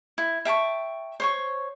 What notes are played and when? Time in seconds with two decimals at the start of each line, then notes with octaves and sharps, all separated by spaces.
0.18 E4
0.45 E5 G5 A5 C#6
1.20 C5 C#5 C#6